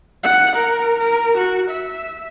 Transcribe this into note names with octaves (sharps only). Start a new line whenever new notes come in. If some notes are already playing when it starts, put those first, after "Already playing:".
F#5
A#4
A#4
F#4
E5